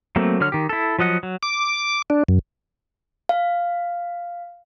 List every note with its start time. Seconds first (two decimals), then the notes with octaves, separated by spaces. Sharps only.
0.16 F#3 A3 A#3 C4
0.40 D3 F#3 C#5 F6
0.52 D#3 G4
0.69 E4 A4
0.99 F3 F#3 D#5 F#5
1.23 F#3
1.43 D6
2.10 D4
2.28 F#2
3.29 F5